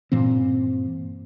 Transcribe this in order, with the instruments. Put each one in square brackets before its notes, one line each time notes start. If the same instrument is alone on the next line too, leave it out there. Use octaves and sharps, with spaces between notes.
[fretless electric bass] G2 A#2 E3 C4